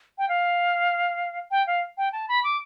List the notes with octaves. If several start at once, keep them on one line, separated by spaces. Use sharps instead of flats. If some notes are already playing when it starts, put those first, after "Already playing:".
G5
F5
G5
F5
G5
A5
B5
D6